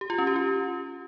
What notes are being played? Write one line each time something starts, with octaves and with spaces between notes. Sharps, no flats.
G4
F4
C#4
G4
F4